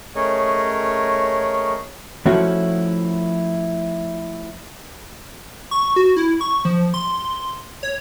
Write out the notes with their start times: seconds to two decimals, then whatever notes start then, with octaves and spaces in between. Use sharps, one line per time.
0.15 A3 C#4 G#4 A#4 C#5 D#5
2.26 F3 A3 C#4 E4 F#4
5.71 C#6
5.96 F#4
6.16 E4
6.41 C#6
6.65 F3
6.94 C6
7.83 C#5